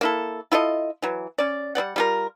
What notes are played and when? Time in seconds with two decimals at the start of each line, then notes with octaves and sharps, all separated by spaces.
0.01 A#3 E4 A4
0.52 E4 F4 A4 D#5
1.02 E3 F#3
1.38 C#4 D5
1.75 G3 C4 D5 F#5
1.96 G3 F4 A#4